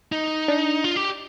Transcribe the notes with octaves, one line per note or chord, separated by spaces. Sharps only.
D#4
D4
F4
G4